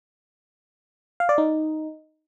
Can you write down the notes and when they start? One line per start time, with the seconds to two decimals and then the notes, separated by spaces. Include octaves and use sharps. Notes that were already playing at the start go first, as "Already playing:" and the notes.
1.20 F5
1.29 D5
1.38 D#4